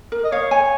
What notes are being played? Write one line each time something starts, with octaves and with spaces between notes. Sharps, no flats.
A#4
D#5
C#5 F5
C#5 G#5